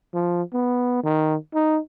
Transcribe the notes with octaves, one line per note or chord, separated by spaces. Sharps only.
F3
B3
D#3
D#4